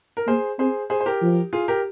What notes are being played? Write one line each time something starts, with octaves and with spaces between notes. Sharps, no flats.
A#4
A#3 G#4 C5
C4 G#4 C5
G#4 C5
C5
G4 A#4
F3
F4 G#4
G4 A#4